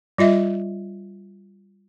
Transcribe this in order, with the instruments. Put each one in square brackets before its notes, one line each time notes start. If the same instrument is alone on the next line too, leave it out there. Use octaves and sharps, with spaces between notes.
[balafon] G3 F4 D#5 E5